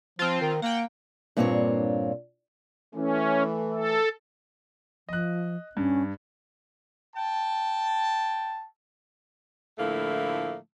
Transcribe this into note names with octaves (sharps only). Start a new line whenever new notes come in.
F3 C4 F4
D#3
A#3 F#5 G5
G2 A#2 A#3 C4 D4 C#5
E3 A3 C#4
A4
F3 D#5 F#6
G2 C#4
G5 A5
A2 D3 F3 A3 A#3 E4